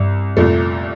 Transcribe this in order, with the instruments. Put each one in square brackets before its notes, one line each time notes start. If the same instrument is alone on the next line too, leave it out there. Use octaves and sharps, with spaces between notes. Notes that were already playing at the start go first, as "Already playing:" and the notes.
Already playing: [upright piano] C2 [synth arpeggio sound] G2
[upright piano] C2 A#2 A3 [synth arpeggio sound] F2